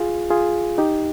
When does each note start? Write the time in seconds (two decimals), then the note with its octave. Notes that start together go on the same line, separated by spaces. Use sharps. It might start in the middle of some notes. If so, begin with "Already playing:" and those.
Already playing: F4 G#4
0.30 F4 G#4
0.78 D#4 G4